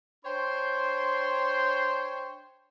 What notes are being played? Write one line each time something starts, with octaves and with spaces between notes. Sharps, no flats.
D4 C5 C#5 G5 C6